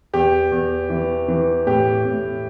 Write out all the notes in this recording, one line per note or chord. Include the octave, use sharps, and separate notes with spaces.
E2 G4
E2
E3
E3
A2 G4
A2